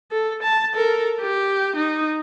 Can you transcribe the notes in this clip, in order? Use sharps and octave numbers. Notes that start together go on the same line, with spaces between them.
A4
A5
A4 A#4
G4
D#4